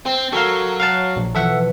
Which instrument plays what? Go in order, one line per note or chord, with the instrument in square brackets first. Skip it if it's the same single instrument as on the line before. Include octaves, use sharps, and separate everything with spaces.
[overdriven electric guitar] C4
[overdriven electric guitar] F#3 [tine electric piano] A4 A#4 F5 [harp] E6
[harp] C#5 F#6 [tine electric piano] F5 F#5 A5
[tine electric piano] A#1
[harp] B2 E3 F3 [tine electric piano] A4 E5 F#5